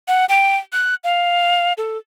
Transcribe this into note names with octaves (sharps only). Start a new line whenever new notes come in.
F#5
G5
F#6
F5
A4